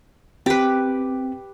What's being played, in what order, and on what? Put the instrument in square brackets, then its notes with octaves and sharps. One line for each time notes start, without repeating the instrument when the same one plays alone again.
[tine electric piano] C4 [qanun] G4 B4